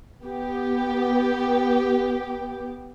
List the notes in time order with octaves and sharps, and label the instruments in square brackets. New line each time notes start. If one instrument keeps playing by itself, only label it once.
[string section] B3 G4